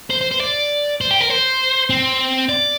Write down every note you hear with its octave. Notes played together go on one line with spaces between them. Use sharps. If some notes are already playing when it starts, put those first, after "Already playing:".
C5
C5
C5
D5
C5
G4
A#4
C5
C4
D5